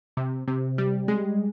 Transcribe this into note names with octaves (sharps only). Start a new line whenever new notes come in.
C3
C3
G3
G#3